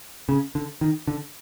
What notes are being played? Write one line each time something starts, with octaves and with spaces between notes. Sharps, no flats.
C#3
D3
D#3
D3